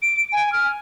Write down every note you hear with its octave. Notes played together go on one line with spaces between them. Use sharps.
D7
G#5
F6